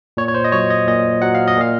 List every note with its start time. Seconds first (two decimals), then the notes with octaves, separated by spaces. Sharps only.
0.17 A#2 C#5
0.28 C#5
0.34 C5
0.44 D#5
0.52 F#3 C#5
0.70 D#5
0.88 A#2 D#5
1.22 F#3 F#5
1.35 F5
1.47 D#5
1.57 A#2 F5